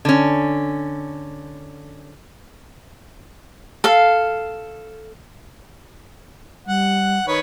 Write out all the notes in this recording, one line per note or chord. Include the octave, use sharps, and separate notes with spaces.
D3 C#4
A4 F5
G3 F#5
D#3 B4 C#5